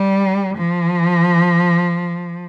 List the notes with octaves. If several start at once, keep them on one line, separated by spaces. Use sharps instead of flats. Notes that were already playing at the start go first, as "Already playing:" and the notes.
Already playing: G3
F3